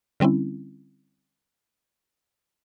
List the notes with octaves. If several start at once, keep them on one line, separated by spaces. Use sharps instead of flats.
D3 G3 C4 C#4 E4